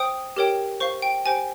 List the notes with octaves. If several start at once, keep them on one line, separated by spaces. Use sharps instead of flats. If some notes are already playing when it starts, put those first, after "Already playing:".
Already playing: C5 G5 D#6
G4 A#4 C#5 G5
C5 F5 C#6
G5
G4 C5 G5 G#5